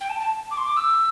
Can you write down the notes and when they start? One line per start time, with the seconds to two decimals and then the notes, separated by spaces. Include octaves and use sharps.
0.01 G5
0.10 A5
0.20 A5
0.51 D6
0.57 C6
0.67 D6
0.77 E6